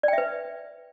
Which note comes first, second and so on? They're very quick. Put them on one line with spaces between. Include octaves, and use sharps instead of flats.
D5 G5 E5 B4